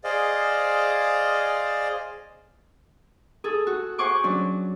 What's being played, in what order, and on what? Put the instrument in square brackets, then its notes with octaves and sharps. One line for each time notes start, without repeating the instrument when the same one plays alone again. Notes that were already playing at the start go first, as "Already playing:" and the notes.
[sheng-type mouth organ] G#4 C5 D5 D#5 F5
[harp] G#4 A4
F#4
C5 F#5 G#5 C#6 D6
F#3 C#4 D4